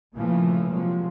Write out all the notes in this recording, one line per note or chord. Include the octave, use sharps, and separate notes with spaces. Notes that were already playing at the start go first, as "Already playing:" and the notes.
A#2 C#3 E3 F3 A3 A#3
C3 F3 F#3 G#3 A#3